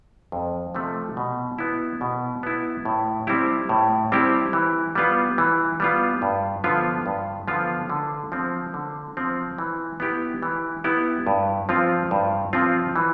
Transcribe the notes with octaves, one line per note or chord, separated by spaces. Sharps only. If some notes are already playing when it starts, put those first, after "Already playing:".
F2
C3 F3 A3
B2
B3 E4
B2
B3 E4
A2
G3 C4 E4 G4
A2
G3 C4 E4 G4
E3
G3 B3 F4
E3
G3 B3 F4
G2
D3 F3 B3 F4
G2
D3 F3 B3 F4
D3
F3 C4
D3
F3 C4
E3
B3 E4 G4
E3
B3 E4 G4
G2
F3 C4 F4
G2
F3 C4 F4
E3